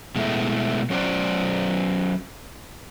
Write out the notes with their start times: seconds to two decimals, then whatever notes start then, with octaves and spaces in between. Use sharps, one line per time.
0.16 B2 G#3 A3 E4
0.90 F#3 C#4 F#4 C5 D5